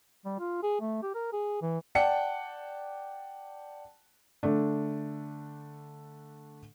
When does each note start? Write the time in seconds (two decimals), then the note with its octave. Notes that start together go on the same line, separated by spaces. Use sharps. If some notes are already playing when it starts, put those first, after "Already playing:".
0.26 G3
0.39 F4
0.63 G#4
0.81 A3
1.03 G4
1.15 A#4
1.33 G#4
1.62 E3
1.95 D5 F#5 G5 A5 C#7
4.43 D3 A3 D4